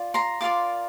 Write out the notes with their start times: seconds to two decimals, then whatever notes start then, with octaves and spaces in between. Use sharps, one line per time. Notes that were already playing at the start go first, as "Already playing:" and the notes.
Already playing: F4 D5
0.14 A#5 C6
0.41 F4 A#4 D5 C6 D6